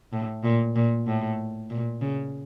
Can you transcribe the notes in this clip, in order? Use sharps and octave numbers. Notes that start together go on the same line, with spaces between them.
A2
A#2
A#2
A2
A#2
C#3